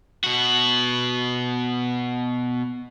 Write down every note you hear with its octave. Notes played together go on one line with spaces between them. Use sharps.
B2 F#4